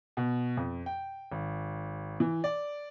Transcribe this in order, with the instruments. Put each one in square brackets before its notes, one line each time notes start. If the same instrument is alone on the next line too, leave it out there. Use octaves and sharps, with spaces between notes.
[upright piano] B2
F2
G5
G#1
E3
D5